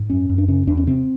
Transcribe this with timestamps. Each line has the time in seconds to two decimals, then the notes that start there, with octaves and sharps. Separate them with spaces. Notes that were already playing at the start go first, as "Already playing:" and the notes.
Already playing: G#2
0.10 F#2 C#4
0.29 F#2
0.38 D4
0.48 C#3 C#4
0.67 E2 D4
0.77 C#4
0.87 C3 C4